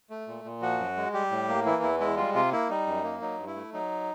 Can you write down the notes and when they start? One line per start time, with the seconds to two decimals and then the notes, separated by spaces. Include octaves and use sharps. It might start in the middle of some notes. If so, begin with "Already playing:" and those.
0.10 A3
0.28 A#2
0.44 A#2
0.62 F3 F#4
0.79 F#2
0.97 G#3
1.14 G3 G4
1.31 A2
1.48 A#3
1.65 E3 E4
1.83 E2 E4
2.00 G#3 E4
2.17 G3 F4
2.34 C3 F4
2.52 A#3 E4
2.69 G3 D#4
2.87 F#2
3.04 A#3
3.21 F#3 D#4
3.39 G2
3.47 E4
3.56 A3
3.73 F#3 D#4